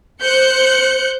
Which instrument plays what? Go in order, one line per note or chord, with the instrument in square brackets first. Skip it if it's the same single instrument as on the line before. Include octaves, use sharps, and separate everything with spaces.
[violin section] C5 F#6 G6 C#7